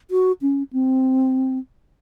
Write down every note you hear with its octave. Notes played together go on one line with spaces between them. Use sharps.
F#4
C#4
C4